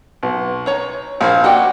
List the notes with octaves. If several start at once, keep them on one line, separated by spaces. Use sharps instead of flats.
B1
D#4 C#5 A#5
A#1 G#4 C5 F5
D#4 F#4 D5 D#5 G5